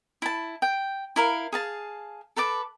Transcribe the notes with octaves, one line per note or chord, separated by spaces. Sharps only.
E4 A5
G5
E4 A#4 F5
G#4 F5 A5
A4 B4 A5 D6